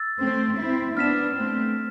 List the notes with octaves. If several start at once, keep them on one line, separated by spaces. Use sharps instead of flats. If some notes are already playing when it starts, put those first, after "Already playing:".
Already playing: E6 A6
A3 C4
C4 E4
B3 D4 F6 B6 E7
A3 C4